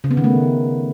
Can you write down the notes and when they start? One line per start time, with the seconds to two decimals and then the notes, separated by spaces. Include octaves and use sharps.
0.04 C#3
0.11 B3
0.17 D#3
0.24 A3